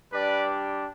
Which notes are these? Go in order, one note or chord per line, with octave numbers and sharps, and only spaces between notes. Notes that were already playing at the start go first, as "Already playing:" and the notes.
G3 D4 G4 B4 D5